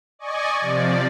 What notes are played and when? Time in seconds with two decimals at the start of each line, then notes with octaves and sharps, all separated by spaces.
0.19 D5 D#5 G#5 C#6
0.61 C3 F3 D5